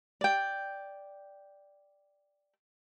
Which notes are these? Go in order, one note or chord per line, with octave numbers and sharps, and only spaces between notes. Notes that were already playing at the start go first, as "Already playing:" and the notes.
D5 G5